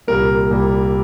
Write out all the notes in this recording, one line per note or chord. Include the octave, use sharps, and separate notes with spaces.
C2 A#2 G3 A#3 A#4
C2 A#2 G3 A#3